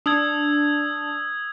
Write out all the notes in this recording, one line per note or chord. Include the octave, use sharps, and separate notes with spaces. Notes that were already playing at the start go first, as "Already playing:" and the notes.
D4 D#6 E6 G#6